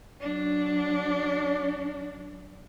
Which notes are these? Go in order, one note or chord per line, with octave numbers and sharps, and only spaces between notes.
F#3 D4